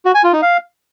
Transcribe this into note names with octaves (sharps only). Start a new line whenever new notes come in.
F#4
G#5
F4
D#4
F5